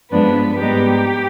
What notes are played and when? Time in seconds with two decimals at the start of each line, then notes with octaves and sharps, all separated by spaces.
0.11 G2 F3 G#3 B3 D4 B4
0.61 G#2 G3 B3 D#4 G4